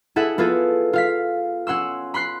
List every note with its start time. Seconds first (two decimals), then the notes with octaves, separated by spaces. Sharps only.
0.16 E4 G#4 A4 E5 F#5
0.38 B3 E4 F4 G#4 A4
0.93 F4 F5 B6
1.67 C#4 F#5 C6 E6
2.14 B5 C6 F#6 C7